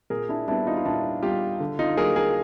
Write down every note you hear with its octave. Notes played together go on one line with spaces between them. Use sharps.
A#2 G#4 A#4
D4 E4
G3 B3 D4 E4
D#4 F4
F4
A#2 D4 E4
G3 B3 F4 G4
D3
D#4 F4
F#3 A#3 G#4 A#4
G#4 A#4